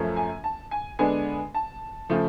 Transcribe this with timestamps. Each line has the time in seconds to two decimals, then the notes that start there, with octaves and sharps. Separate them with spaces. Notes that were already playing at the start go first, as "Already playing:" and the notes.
Already playing: F#2 F3 A3 C#4
0.16 G#5
0.44 A5
0.71 G#5
0.99 D3 G#3 B3 D4 G#5
1.55 A5
2.09 C#3 F3 A3